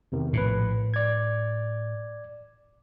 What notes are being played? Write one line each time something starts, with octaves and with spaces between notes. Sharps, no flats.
E2 C3 D#3
A#1 A2 B4
D5 G#6